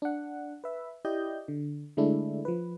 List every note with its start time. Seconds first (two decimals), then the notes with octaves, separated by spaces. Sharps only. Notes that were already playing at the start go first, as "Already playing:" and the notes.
0.02 D4 F#5
0.64 B4 E5
1.05 E4 G4 D5 D#5 G6
1.48 D3
1.97 D3 G#3 A3 D4 E4
2.45 F3 B4